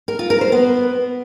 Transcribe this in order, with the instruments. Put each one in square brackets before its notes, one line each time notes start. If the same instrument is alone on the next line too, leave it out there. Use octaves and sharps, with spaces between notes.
[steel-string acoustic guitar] A#4
F4
A#4
C5
B3